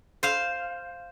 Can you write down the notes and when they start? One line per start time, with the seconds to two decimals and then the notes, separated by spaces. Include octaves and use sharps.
0.23 C5 F5